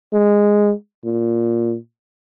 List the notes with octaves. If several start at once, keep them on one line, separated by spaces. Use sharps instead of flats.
G#3
A#2